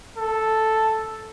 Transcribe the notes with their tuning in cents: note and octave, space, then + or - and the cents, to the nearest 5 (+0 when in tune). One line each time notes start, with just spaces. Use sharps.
A4 +0